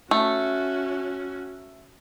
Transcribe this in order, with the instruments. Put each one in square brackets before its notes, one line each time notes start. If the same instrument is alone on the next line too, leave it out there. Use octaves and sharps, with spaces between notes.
[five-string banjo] A3 [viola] C#4 F#4